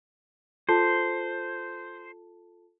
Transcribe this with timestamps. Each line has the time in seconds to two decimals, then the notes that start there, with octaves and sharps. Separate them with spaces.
0.69 F4 A4 C5 A5